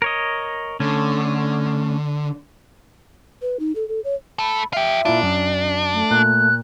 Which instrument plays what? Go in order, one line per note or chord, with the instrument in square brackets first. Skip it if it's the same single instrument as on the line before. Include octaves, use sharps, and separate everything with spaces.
[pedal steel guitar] A#4 C#5 D#5
[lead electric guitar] D3 [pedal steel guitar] A3 C#4
[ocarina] B4
D#4
A4
A4
C#5
[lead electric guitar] A3 A4 [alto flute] B5
[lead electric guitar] F4 G4 [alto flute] E5
[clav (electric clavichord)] A#2 E4 F4 [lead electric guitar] D4
[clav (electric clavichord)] F#2 [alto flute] C#4
[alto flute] A3
[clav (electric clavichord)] A#2 [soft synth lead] F#6